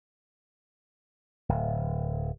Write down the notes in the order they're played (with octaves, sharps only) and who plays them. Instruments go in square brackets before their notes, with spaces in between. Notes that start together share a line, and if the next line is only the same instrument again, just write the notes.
[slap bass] D1